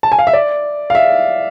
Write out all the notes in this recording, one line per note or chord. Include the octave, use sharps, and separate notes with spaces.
A5
G#5
F5
E5
D5
F5
E5